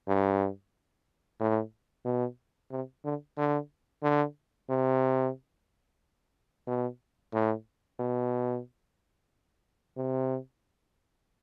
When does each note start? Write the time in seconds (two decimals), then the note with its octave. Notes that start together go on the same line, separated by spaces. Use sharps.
0.08 G2
1.40 A2
2.05 B2
2.71 C3
3.04 D3
3.38 D3
4.03 D3
4.70 C3
6.67 B2
7.33 A2
8.00 B2
9.97 C3